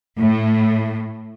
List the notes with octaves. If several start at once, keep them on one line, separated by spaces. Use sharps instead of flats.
A2